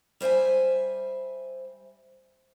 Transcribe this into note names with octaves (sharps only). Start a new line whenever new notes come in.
G3 C5 D5 E5 G#5